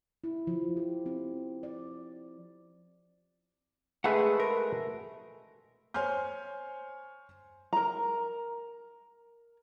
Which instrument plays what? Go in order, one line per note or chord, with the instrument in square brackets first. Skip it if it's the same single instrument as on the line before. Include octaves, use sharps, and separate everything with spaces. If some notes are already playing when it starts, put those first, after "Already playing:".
[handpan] E4
F3
G4
C4
D5
[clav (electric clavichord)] G#3 A3 B4 [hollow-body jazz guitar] G#4 F#5
[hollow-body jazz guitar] A#4
[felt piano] C5 C#5 G#5 C6 F6 G6
[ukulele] A#4 A#5